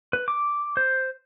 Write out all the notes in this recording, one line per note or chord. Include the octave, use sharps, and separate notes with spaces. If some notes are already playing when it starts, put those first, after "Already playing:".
B4
D6
C5